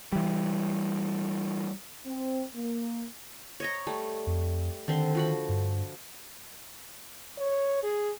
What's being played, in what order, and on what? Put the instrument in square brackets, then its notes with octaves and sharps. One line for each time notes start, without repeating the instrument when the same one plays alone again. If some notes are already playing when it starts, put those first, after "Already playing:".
[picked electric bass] E3 G3
[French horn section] C4
A#3
[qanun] C#5 D#5 A#5
G3 A3
[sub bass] F2
[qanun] D3 C4 C6 [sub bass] D#3
[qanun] F3 F#4 B5
[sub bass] G2
[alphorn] C#5
G#4